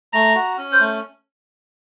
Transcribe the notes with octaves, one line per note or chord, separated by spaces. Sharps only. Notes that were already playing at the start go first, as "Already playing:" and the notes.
A3 A#5
F#4
C#4
C5
A3